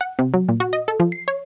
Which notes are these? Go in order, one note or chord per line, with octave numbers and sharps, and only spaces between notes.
F#5
C3
F#3
A#2
F#4
D#5
A4
F3
C7
C#5